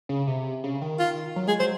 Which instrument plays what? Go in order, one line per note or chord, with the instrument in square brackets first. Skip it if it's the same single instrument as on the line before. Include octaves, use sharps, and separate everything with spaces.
[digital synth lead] C#3
C3
C#3
D#3
[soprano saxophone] F4
[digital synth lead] F#3
[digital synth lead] G#3 [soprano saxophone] G#4
[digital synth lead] F#3 [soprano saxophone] C5